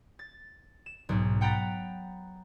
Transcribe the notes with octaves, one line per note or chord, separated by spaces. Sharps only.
A6
E7
B1 G#2 B2
F#5 G5 A#5 B5 A6